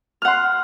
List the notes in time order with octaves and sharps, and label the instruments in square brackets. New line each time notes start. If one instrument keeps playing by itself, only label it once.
[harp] F6
F#5
C6